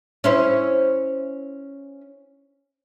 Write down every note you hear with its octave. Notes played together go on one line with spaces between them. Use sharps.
C#4 E4 C5